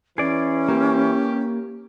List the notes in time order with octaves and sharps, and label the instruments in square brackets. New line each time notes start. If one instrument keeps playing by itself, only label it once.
[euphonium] E3 [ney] C#4 [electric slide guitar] G#4 D5
[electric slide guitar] A#3 [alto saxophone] G4